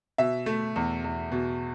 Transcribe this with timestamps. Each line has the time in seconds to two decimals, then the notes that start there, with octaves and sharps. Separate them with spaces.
0.18 B2 E5
0.46 A3
0.76 E2
1.04 E2
1.32 B2